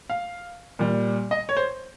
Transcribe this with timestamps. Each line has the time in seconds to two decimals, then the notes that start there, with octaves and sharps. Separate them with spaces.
0.10 F5
0.79 A#2 G3
1.31 D#5
1.49 C#5
1.57 C5